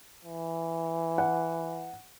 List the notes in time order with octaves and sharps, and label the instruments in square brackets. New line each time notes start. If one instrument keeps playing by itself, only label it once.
[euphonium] E3
[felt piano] F#5